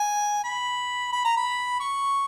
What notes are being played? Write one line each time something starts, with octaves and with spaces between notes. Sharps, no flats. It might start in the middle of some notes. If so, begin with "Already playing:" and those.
Already playing: G#5
B5
B5
A#5
B5
C#6